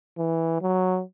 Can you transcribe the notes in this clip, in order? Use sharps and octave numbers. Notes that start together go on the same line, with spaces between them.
E3
F#3